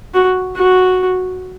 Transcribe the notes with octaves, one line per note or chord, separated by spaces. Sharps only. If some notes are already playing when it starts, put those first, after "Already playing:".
F#4
F#4